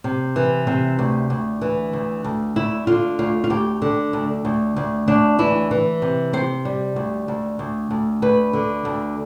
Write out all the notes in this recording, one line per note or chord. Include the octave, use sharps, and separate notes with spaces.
C3
E3
C3
D2
D2
E3
D2
D2
D2 E4
D3 F4
D2 F4
F4
D2 G4
D3
D2
D2
D2
D2 D4
E3 E4
E3
C3
C3 C5
G3
D2
D2
D2
D2
D2 B4
D3
D2